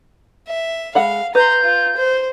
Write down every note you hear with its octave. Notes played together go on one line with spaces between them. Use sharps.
E5
G#3 F5 F#5 B5
B4 A#5 C6 G6
F4
C5